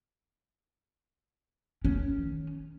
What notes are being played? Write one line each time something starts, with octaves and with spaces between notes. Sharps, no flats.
D#3 C#4